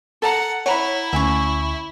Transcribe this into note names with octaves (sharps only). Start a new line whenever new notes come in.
A4 F#5 A5 A#5
E4 C#5 F#5 A#5 B5
D2 C#4 E5 G#5 C#6